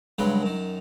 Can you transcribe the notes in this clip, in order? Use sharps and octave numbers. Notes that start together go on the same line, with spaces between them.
C#2 G2 F#3 G#3 B4 G5
F#2 D#3